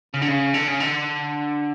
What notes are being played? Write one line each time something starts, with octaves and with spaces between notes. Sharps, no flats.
C#3
D3
C#3
D3
C#3
D3